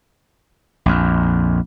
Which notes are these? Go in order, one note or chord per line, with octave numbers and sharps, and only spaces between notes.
A#1 F2